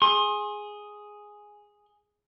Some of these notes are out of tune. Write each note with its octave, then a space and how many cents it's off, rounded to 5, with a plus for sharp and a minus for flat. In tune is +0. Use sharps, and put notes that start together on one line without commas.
G#4 +0 C6 +30